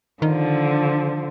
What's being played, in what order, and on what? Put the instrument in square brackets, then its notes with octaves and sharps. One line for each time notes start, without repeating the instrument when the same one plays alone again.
[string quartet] D3 F3 [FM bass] D#3